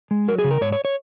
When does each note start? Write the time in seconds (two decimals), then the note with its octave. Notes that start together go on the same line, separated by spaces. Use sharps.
0.11 G#3
0.28 F#3 A#4
0.39 G#4
0.44 C#3
0.51 A#4
0.61 G#2 C#5
0.72 C#5
0.85 C#5